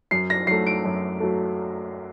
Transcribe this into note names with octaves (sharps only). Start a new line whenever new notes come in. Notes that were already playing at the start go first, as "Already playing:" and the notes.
F#2 C7
A#6
F#3 A3 C7
D7
F#2
F#3 A3